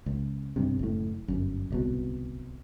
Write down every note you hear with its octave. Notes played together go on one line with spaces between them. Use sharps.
C#2
B1 G2 C3
F#1 A2
G1 F#2
D1 C2 B2